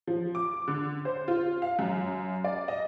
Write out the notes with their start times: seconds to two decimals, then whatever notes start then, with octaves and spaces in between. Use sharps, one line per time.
0.07 F3
0.35 D6
0.68 D3
1.05 C5
1.28 F4
1.62 F5
1.79 F#2
2.44 D5
2.68 D#5